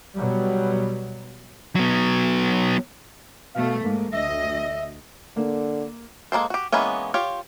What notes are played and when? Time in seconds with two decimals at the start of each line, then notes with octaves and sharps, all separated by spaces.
0.14 B2 F#3 G3
1.75 F#3 B3
3.55 B2 A3 F5
3.84 G#2 A#3
4.13 D2 D#5 E5
5.36 D3 A#3
6.32 G#3 A#3 A4 C5
6.50 F#4 G4
6.73 E3 G#3 A#3 B3 C#4
7.14 F4 G4 C#5